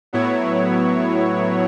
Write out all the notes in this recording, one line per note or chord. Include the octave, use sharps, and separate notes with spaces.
A2 F#3 B3 E4 C#5